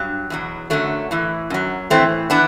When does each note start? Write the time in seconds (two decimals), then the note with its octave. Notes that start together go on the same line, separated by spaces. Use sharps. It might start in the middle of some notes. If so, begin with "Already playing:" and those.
Already playing: G2 F#3
0.30 E2 B2 F#3
0.70 F#2 D3 F#3 A3
1.11 A2 E3
1.50 F#2 F#3
1.90 A2 E3 A3 C4
2.30 E3 B3 D4